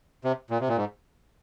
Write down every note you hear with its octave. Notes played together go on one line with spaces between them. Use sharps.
C3
A#2
C3
A#2
G#2